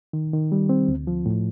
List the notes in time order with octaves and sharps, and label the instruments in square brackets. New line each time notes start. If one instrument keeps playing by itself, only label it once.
[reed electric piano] D#3
D#3
G3
C4
D2
F3
A2